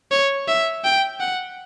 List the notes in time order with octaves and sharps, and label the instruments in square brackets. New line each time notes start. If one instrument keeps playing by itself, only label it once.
[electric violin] C#5
E5
G5
F#5